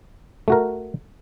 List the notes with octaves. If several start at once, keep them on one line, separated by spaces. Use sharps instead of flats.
A3 F#4 A#4